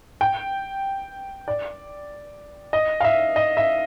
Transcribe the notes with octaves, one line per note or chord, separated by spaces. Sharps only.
G5
D5
D#5
F5
E5
D#5
E5